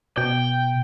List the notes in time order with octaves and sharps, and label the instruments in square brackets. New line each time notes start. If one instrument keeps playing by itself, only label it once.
[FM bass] B2 [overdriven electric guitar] G5